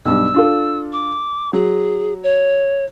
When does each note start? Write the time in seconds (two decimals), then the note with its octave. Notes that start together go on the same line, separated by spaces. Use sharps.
0.05 B1 G2 E6
0.34 D4 F4 A4
0.93 D6
1.53 F#3 G#4
2.23 C#5